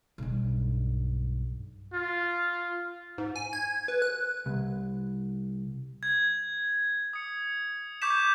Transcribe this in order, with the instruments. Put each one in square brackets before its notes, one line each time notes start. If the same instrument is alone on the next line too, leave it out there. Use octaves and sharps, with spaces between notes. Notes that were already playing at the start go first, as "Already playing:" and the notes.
[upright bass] B1 G2
[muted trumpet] F4
[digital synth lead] G#2
G#5
G#6
B4
F#6
[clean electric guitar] C2
[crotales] G#6
D#6 C#7
C#6 D6 G6 B6 E7